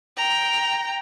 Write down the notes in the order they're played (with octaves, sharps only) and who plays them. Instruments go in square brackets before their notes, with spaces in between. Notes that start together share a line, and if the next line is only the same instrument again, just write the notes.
[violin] G5 A#5